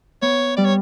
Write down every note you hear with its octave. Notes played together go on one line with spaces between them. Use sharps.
B3 C#5
G3 D5
C#5